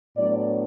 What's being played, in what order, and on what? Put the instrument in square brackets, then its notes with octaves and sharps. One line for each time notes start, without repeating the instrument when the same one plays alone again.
[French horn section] A2 F#3 B3 D4 D5